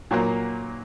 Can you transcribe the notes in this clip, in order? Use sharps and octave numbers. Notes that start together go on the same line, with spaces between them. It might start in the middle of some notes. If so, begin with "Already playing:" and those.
A#2 F#3 A#3